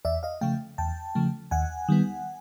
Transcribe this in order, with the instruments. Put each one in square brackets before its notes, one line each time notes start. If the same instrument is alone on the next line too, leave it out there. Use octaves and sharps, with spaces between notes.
[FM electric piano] E2 D5 E5
D#5 F5
C#3 F3 A3 F5 G5
E2 G5 A5
C#3 F3 A3
D#2 F#5 G#5
D#3 G3 B3